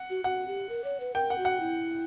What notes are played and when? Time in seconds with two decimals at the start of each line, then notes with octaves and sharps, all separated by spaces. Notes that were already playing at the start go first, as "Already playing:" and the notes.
Already playing: F#5
0.10 F#4
0.24 F#4 F#5
0.47 G4
0.69 A#4
0.84 C#5
1.00 B4
1.14 A#4 G5
1.30 F#5
1.38 F#4
1.45 F#5
1.61 E4